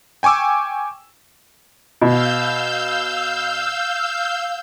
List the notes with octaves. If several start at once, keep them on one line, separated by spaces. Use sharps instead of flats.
G5 G#5 C#6 D6 E6
B2 F5 E6 G6